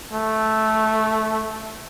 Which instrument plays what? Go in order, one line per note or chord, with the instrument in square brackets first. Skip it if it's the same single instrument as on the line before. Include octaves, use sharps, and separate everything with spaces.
[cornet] A3